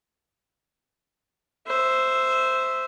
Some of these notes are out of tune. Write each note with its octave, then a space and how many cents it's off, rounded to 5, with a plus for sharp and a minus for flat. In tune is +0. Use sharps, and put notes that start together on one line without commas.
C5 -5 E5 +0